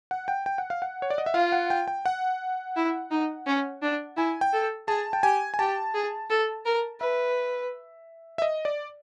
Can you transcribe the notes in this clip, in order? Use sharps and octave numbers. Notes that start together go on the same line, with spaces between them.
F#5
G5
G5
F#5
F5
F#5
C#5
D5
D#5
E5
F4 F5
F#5
G5
G5
F#5
E4
D#4
C#4
D4
E4 G#5
G5
A4
G#4 A5
G5
G4 G#5
G#5
G4 A5
G#4
A4
A#4
B4 E5
E5
D#5
D5